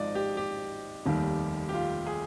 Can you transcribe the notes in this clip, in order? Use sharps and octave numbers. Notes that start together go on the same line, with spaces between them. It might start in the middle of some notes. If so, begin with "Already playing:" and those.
Already playing: G#1 G#2 F3 D5 D#5
G4
G4
F1 D#2 D#3 G3
G4
F4
G#4